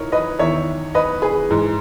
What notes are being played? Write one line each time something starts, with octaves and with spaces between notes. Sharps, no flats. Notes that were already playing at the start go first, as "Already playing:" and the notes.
Already playing: A#2 D#4 E4 A#4 C#5
B4 D#5
E2 D#3 C#5 E5
B4 D#5
G#4 B4
G#2 E3